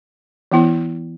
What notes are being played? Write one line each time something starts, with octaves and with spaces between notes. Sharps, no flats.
E3 B3 E4